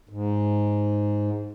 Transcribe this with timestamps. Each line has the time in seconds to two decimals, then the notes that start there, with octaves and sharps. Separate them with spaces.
0.09 G#2